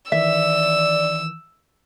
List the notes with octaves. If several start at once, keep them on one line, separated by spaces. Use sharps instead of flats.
D#3 E3 D5 E5 E6